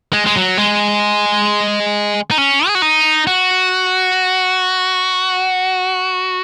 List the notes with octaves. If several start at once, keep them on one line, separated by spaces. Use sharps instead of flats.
G#3
G#3
F#3
G#3
D#4
C#4
G#4
F#4
D#4
F#4